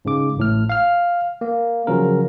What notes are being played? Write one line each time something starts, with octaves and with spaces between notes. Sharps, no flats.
G#2 C#3 D6
A1 A2 F6
F5 F6
A#3
C#3 F3 F#3 C#4 A#4